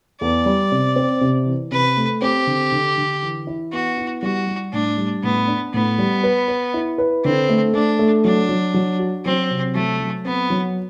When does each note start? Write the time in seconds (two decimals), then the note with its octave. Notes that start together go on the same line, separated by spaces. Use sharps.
0.21 E2 D5
0.46 G3
0.72 C3
0.96 C4
1.21 C3
1.46 E3
1.72 C3 B4
1.97 A3
2.21 C4 G4
2.47 D3
2.72 D3
2.97 D3
3.22 E3
3.47 E4
3.72 B3 F#4
3.97 E4
4.22 G3 F#4
4.47 G3
4.72 A2 D4
4.97 G3
5.23 A2 B3
5.48 D4
5.73 A2 B3
5.98 G3
6.23 B4
6.48 B4
6.74 E4
6.98 B4
7.24 D3 C4
7.49 A3
7.74 A3 D4
7.99 A3
8.24 F#3 D4
8.49 F#3
8.74 F#3
8.99 F#4
9.25 F#3 C4
9.51 C3
9.75 F#3 A3
10.00 F#3
10.25 B3 C4
10.50 F#3